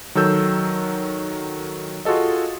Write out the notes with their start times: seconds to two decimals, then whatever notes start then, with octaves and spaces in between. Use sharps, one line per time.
0.15 D#3 F#3 A4 E6 G6
2.05 F4 F#4 G#4 A4 D#5